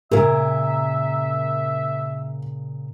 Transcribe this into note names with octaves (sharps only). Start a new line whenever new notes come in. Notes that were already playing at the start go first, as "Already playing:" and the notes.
A#2 C#3 A#3 A#4 E5